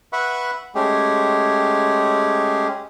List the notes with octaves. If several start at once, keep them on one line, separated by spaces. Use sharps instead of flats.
B4 E5 F#5 B5 C#6
G#3 A3 C#4 G4 G#4